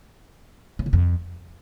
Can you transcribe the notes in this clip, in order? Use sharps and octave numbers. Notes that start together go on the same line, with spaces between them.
C#3
E2
F2